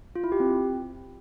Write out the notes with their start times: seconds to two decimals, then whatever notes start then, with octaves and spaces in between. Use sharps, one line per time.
0.16 F4
0.24 E4
0.32 G4
0.40 C4